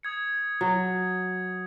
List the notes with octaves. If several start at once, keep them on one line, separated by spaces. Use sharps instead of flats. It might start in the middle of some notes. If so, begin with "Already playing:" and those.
D#6 G#6 C#7
F#3